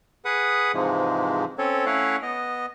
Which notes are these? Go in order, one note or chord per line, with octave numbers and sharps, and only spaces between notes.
G#4 B4 F#5 D#6
G#2 C3 E3 F3 G#3
C4 C#4 A4 C#5
A3 C#4 E4 C#5 F5 F#5
B3 D#5